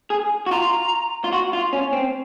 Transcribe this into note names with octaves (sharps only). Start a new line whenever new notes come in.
G#4
F#4
F4 A#5
F4
F#4
F4
C#4
C4